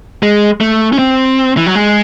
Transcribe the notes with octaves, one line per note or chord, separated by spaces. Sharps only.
G#3
A3
C#4
C4
E3
F#3
G#3